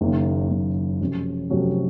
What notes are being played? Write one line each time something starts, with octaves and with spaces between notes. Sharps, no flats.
F#1 F#2 D#3 A#3
F#1 F#2 D#3 A#3
F1 F2 C3 F#3 C#4
F1 F2 C3 F#3 C#4